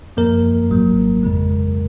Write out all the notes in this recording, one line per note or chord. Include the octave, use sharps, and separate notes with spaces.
F#2 F3 A#3 A#4
G#1 G#2 F#3 A#3
F2 C#3 G#3